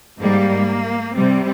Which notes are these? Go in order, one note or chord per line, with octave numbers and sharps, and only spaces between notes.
G#2 G3 A#3
C3 G3 C4